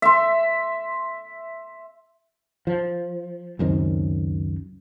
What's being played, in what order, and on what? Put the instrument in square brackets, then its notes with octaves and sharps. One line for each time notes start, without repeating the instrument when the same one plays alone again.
[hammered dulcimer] E5 C6
[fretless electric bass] F3
C#2 F#2 D#3 C4